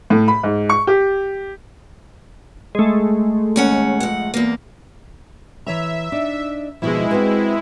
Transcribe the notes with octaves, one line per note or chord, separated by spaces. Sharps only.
A2
B5
G#2
C#6
G4
G#3 A3
D#2 C#4 F#5
F2 F#5
E2 A#3
E3 C#5 E5 A#5
D4 D#4
D#2 B2 F3 G#3 E4
C4 F#4 B4